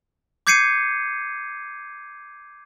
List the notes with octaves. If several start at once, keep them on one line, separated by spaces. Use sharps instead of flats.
D6 G6 G#6 C7 C#7 D#7